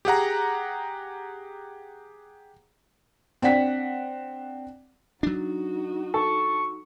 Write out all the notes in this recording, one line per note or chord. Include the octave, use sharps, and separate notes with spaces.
G4 G#4 F#5 A#5
C4 D4 F#5 B6
F#3 D4 D#4 F#4
A4 C#6